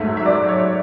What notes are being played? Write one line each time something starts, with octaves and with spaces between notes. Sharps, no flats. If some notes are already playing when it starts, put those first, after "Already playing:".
Already playing: G#2 F#3 A3 E5
E5
D5
C#5